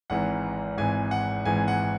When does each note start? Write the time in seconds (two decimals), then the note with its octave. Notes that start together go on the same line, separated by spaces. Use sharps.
0.10 G#1 G#2 E3 F#5
0.78 G#1 G#2 E3 G#5
1.11 F#5
1.45 G#1 G#2 E3 G#5
1.68 F#5